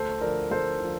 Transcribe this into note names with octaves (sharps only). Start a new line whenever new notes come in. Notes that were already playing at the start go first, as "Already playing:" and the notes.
Already playing: D2 A4 C5
D3 F3 A#4 D5
D2 A4 C5
D3 F3